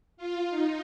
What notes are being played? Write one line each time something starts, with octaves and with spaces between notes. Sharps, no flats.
F4
D#4